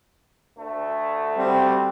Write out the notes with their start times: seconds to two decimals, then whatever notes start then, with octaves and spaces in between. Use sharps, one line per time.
0.58 D2 A3
1.37 G3 C4 F#4